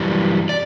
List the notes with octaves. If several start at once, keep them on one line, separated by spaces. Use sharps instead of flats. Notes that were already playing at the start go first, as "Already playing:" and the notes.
Already playing: F#2 E3 G3
D5